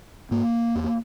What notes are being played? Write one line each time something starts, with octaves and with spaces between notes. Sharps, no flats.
G#2 A#3
E2